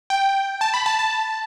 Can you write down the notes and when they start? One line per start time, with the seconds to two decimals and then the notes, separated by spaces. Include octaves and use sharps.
0.10 G5
0.61 A5
0.74 B5
0.86 A5
0.99 A5